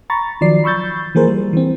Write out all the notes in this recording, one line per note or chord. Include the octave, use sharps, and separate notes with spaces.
A#5 B5 C#6 A6
D#3 F3 F#3 D5 C7
B5 C#6 E6 G6 A6
E3 F3 A#3 G#4 A#4 C5
G3
E3 C4